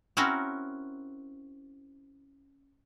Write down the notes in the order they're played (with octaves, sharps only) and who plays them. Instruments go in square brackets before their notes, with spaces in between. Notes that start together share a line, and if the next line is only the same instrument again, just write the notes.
[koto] C4 C#4 E4 F#4 A#4